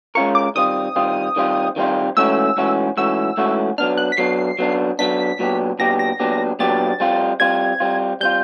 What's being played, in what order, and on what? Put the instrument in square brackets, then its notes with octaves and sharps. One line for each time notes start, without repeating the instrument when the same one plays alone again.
[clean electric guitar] G#3 C#4 F4 A#4 [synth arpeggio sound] C#6
[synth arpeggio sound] D6
[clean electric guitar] D#3 G3 C4 F4 [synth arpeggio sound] D#6
[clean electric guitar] D#3 G3 C4 F4
D#3 G3 C4 F4
D#3 G3 C4 F4
[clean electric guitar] G#2 E3 A3 C#4 F#4 [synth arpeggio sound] E6
[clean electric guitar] G#2 E3 A3 C#4 F#4
[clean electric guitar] G#2 E3 A3 C#4 F#4 [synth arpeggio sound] E6
[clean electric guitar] G#2 E3 A3 C#4 F#4
[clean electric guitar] F#3 B3 D4 [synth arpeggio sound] F6
[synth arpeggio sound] F#6
B6
[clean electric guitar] F#3 B3 D4 [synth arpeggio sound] C7
[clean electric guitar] F#3 B3 D4
[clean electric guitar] F#3 B3 D4 [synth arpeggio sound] B6
[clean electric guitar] A#2 F#3 B3 D4 G4
[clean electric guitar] A#2 F#3 B3 D4 G4 [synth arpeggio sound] A#6
[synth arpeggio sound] A#6
[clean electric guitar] A#2 F#3 B3 D4 G4
[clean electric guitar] A#2 F#3 B3 D4 G4 [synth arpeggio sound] A6
[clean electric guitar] G3 C4 F4
[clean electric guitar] G3 C4 F4 [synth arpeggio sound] G#6
[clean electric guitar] G3 C4 F4
[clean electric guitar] G3 C4 F4 [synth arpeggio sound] G6